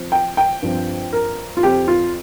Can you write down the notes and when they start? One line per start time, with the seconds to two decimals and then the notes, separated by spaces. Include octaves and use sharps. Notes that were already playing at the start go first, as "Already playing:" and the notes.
Already playing: F3 C4
0.12 G5
0.37 G5
0.62 G2 F3 C4
1.13 A#4
1.57 F4
1.63 F2 F3 C4 G4
1.88 F4